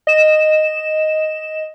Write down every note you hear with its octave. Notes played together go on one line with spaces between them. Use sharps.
D#5 E7